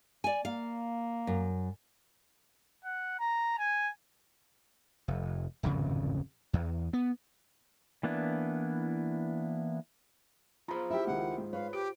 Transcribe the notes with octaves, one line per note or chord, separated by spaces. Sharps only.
D5 G#5
A#3 F5
F#2
F#5
A#5
G#5
F1
D1 G#1 F2 C#3
E2
B3
E3 A#3 B3 D4 E4
F4 G#4 C5 A#5 B5
E4 G4 E5
C#2 D#3 F#5
G#2
B4 C#5 F5
G4 D7